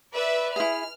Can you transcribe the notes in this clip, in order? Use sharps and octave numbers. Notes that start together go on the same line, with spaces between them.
B4 D5 E5
E4 G#4 E5 F6